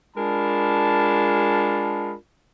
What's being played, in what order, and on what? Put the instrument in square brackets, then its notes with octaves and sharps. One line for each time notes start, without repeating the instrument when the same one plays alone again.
[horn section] G#3 D4 F4 A#4 A5 B5